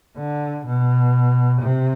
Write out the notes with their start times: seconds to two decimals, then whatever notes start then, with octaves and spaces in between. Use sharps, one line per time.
0.17 D3
0.66 B2
1.61 C3